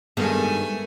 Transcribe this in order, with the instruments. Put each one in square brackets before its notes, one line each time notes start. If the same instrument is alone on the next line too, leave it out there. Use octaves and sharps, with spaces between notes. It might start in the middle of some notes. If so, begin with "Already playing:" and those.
[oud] G2 D#3 G#3 [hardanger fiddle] A3 G#5 [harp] B3 A4